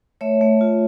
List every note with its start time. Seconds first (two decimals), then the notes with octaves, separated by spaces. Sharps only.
0.21 A3 C#5 E5
0.41 A3
0.61 F4